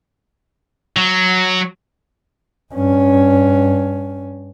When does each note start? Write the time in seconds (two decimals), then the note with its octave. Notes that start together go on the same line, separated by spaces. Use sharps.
0.97 F#3
2.73 G2 C#4